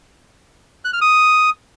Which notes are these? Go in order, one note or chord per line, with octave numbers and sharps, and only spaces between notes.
F#6
F6
D#6